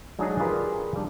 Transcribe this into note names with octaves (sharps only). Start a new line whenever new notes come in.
F#3 G#3 D4 D#4 G#4
F4 G4 G#4 A#4 B4 D5
G3 D4